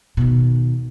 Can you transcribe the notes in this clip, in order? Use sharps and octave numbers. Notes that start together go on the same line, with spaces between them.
B2 D#3